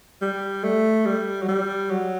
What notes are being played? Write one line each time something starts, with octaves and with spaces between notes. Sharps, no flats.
G3
A3
G3
F#3
G3
F#3